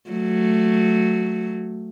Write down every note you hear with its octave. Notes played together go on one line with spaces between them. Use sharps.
F#3 A3